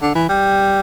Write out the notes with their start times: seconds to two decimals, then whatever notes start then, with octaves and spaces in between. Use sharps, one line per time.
0.02 D3
0.15 E3
0.29 G3